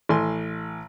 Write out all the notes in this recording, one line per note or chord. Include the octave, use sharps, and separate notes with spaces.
A1 A2 G#5 C6